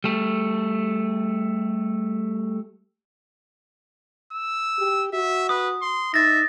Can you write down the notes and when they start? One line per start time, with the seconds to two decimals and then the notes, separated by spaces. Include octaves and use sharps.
0.04 G3 A3
4.33 E6
4.79 G4
5.13 F#4 E5
5.49 B4 D#6
5.82 C6
6.14 D#4 E5 A6 A#6